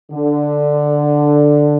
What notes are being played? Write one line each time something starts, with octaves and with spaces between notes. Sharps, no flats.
D3